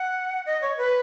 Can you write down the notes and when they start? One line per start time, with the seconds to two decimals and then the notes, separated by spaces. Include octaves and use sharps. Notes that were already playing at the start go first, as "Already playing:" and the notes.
Already playing: F#5
0.46 D#5
0.62 C#5
0.77 B4